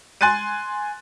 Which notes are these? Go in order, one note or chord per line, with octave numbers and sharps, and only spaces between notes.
G#5 C6 F#6 A6 D#7